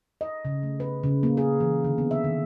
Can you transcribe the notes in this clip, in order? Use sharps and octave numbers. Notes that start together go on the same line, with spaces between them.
D#5
C#3
A3
B4
C#3
A#3
G#4
E3
D3
B3
E5
D#3